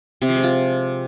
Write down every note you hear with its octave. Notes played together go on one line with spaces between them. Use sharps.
C3
F3
G#3
F4